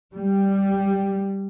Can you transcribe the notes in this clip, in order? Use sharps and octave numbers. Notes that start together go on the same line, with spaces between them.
G3